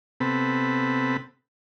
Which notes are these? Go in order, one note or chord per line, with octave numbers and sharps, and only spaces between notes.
C3 B3 C4 A4 B5